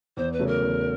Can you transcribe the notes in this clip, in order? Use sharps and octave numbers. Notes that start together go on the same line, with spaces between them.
E2 C5
B4
C#3 F#3 A3
A#4
E2